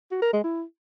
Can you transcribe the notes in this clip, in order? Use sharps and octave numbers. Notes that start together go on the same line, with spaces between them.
F#4
A#4
G#3
E4